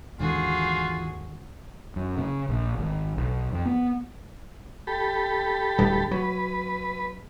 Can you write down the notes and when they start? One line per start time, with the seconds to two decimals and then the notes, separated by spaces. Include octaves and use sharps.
0.19 D#2 G#2 D3 E3 F4 F#4 G#4
1.96 F#2
2.18 C#3
2.49 A#1
2.78 G#1
3.18 B1
3.52 F2
3.65 B3
4.87 G4 A4 B5
5.78 D1 G2
6.11 F#3 B4